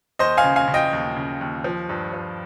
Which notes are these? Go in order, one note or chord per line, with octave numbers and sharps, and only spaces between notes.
D#2 C5 D#5
F5 G#5
C#3
F5 G#5
C#3
D#5 G5
D#2
C#3
D#2
F3
G2
F3